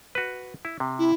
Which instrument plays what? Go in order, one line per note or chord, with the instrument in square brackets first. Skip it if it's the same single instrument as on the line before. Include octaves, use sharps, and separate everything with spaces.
[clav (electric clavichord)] F#4 B4
E4
C3
[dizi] E4